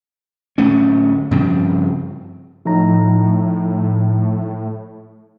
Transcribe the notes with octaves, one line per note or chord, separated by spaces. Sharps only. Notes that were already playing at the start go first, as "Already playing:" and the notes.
D1 A3 C#4
G2 C#3 F3 C4
A2 F3 D#4 A#5